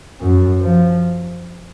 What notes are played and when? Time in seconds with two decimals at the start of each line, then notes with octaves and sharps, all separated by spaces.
0.20 F#2
0.61 F3